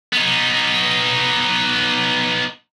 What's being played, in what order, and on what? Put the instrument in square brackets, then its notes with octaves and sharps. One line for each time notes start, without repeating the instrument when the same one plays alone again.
[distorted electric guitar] B3 D#4